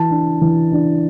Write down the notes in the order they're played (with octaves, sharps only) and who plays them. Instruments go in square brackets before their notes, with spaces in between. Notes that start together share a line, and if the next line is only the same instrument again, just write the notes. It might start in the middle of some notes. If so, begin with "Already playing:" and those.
Already playing: [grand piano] E3 A5
D4
E3
D4